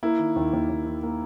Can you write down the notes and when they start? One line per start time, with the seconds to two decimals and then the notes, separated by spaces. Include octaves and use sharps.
0.03 A#3 E4
0.19 D#3
0.36 D#2
0.53 D#2
0.70 D#2
0.86 D#3
1.03 A#3